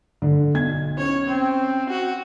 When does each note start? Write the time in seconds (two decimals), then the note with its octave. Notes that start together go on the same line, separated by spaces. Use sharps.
0.22 D3
0.54 B1 G#6
0.98 C#4 C#5
1.27 C4
1.89 F#4